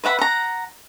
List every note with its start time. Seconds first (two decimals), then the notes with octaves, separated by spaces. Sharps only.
0.04 B4 E5 F#5 B5
0.19 F#5 A#5